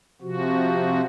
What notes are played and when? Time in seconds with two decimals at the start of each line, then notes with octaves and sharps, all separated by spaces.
0.22 C3 F3 F#4